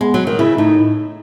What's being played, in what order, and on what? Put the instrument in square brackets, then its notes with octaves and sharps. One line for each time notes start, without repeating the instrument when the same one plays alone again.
[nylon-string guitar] G#3 [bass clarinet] B3
[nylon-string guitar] F#3
D#3
[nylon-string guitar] C#3 [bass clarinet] E4
[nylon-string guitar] A2 [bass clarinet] D#4